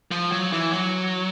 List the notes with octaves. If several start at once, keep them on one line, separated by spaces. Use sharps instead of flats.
F3
F#3
E3
F#3